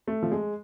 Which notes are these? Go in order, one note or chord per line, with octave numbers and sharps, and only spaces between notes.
A3
F3
G#3